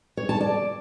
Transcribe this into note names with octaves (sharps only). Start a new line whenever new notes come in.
C#5
A5
D5